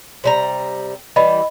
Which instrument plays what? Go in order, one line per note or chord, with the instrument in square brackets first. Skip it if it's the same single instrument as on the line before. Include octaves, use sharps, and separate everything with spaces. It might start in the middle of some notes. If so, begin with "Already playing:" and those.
[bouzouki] C3 G3 A#5
[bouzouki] E3 G3 [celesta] D#5 B5